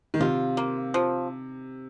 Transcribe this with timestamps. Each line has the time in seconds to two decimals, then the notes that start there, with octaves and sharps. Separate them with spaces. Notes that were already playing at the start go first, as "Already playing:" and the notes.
0.14 D#3
0.20 C3 F4
0.57 A#3
0.94 F3